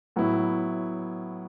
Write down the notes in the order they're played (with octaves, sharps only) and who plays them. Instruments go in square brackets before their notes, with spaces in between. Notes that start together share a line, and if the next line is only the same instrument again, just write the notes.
[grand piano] A2 F#3 B3 E4